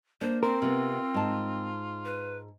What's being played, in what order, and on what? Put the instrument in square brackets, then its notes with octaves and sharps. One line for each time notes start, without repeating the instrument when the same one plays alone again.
[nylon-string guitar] A#3 D4 [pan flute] C5
[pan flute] C4 [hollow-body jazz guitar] A#4 [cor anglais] C5
[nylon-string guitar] C3 B3 [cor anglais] F4
[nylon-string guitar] G#2 A5
[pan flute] B4